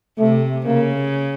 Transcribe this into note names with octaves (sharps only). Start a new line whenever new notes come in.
C3 A3
C#3 A#3